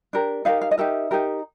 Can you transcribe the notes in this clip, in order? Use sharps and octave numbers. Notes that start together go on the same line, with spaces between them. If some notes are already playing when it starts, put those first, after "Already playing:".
D4 G4 A#4
D#4 G4 A#4 F5
F5
D#5
D#4 G4 A#4 E5
D#4 G4 A#4